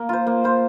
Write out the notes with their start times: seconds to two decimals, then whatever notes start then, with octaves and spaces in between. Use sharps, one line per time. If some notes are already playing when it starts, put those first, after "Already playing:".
Already playing: A#3
0.09 F4 C5
0.27 A#3
0.44 F4 C5